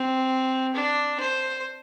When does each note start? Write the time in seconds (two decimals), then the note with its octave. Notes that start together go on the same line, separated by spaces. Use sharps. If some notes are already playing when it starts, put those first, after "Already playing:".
Already playing: C4
0.74 D4
1.20 C5